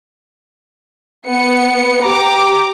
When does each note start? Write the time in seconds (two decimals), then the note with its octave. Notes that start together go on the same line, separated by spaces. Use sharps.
1.27 B3 C#7
2.04 G4 A#5 D6